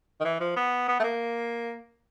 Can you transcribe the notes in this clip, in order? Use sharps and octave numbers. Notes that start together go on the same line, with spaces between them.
D#3
E3
F3
B3
B3
A3
A#3